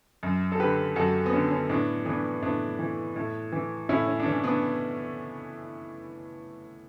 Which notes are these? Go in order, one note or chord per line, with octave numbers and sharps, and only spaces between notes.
F#2
A4
D3 G4 B4
F#2 F#4 A4
B3
D3 C#4
C#4
A2 B3 D4
E3 B3 D4
A2 B3 D4
E3
A2
E3
A2 C#4 E4
C#4
D4
E3 C#4
B3 D4